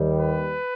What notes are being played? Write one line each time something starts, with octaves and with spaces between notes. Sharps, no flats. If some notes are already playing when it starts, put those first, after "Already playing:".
Already playing: D#2 D#3 G3
B4